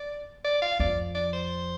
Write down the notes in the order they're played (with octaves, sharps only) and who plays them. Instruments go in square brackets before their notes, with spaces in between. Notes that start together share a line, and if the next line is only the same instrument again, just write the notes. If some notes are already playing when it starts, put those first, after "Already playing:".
Already playing: [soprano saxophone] D5
D5
F5
[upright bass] F2 [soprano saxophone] D5
[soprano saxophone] D5
C5